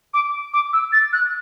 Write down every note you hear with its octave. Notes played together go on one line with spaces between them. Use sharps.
D6
D6
E6
A6
F#6